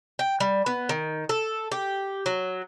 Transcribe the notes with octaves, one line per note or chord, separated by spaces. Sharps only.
G5
G3
B3
D#3
A4
G4
F#3